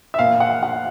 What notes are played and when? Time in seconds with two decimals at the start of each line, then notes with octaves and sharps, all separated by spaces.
0.14 E5
0.19 A#2 F5
0.40 F#5
0.63 F#5